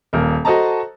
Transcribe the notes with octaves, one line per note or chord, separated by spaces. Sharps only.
D#1 A#3 A#4
F#4 A4 C5 D#5 A5 A#5